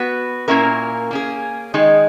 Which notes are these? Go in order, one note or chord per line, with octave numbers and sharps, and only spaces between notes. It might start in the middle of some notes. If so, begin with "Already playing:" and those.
Already playing: B3 F#4 B4
A#2 A#3 C#4 E4 A#4
A#3 C#4 G#4
D#3 G#3 D#4 G#4